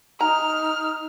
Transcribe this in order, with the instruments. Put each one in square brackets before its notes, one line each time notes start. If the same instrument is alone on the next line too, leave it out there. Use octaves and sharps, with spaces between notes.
[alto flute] D#4 [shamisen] A#5 [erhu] F6